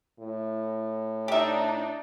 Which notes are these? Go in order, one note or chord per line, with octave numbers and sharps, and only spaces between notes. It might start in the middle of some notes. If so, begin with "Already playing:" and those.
A2
D4 D#4 G4 E5